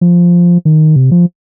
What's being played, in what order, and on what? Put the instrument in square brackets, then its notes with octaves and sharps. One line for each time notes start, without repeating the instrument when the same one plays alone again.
[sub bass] F3
D#3
C3
F3